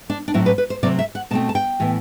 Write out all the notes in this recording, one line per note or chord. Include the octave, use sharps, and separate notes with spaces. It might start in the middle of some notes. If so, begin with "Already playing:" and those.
D4
D4
A2 F#3 C4 E4
B4
B4
C5
C3 F#3 A3 C4 D5
E5
F#5
B2 A3 C4 A5
A5
G5
A2 E3 B3